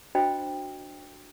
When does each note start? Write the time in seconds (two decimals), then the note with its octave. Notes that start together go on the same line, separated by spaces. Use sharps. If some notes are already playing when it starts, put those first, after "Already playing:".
0.15 D4 F#4 C5 D#5 G5 B5